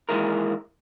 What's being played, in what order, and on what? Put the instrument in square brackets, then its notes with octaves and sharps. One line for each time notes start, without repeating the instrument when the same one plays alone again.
[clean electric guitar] D#3 E3 G#3 A#3 E4 A#4